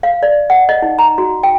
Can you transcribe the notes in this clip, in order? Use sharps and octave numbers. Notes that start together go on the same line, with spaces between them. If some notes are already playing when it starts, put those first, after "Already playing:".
F5
D5
F#5
D#5
D#4
A#5
F#4
G5